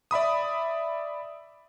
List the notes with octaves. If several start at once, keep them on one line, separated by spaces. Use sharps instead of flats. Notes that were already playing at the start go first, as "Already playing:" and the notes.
D5 E5 B5 D#6